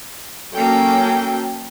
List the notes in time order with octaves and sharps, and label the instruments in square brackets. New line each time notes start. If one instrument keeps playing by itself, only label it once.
[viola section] F#3 C#4 A4 [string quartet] A#3 G5